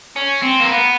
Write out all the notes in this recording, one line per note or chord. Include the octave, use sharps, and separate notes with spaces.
C#4
C4
A#3
B3